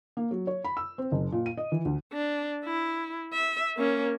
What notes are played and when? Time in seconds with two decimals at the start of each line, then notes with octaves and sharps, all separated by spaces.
0.17 A#3
0.31 F#3
0.47 C#5
0.65 B5
0.77 E6
0.98 C4
1.12 F#1
1.32 A#2
1.46 D#7
1.57 D#5
1.72 E3
1.85 D2
2.13 D4
2.65 E4
3.33 E5
3.77 A#3 C#4